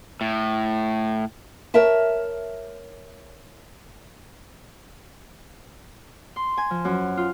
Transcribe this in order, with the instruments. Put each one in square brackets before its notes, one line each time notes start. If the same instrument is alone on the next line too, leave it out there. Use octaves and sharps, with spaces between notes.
[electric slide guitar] A2
[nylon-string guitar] A#4 C#5 E5 A5
[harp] C6
G#5
F3
F#2
F4